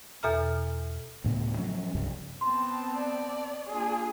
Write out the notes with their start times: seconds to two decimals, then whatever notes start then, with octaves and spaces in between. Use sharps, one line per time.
0.23 E2 B2 A4 E5 A#5 F6
1.24 D2 A2 C#3 B3
1.56 F3 F#3 C#4
1.95 C2 G2 C#3
2.41 B3 C4 A5 C6
2.96 D5
3.69 A#3 D4 F4 G#4